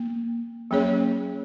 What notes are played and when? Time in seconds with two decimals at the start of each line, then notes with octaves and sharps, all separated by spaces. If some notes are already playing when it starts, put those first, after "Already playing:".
Already playing: A#3
0.71 F#3 A#3 C#4 G#4 C#5